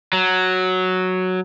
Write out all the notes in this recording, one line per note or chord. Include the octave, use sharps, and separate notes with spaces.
F#3